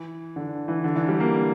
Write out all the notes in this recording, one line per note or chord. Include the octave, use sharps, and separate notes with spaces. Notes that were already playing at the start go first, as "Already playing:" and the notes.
Already playing: E3
D3
E3
D3
E3
G3
A#3